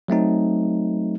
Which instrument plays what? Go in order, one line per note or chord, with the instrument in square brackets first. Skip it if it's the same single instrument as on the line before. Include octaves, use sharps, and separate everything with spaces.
[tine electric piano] F#3 A3 C4 D#4